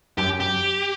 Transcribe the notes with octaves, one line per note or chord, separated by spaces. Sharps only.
F#2 G4
G4